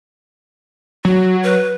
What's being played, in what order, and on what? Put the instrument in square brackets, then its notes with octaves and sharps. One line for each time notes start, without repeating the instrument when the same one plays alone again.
[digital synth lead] F#3 [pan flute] F#4
[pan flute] B4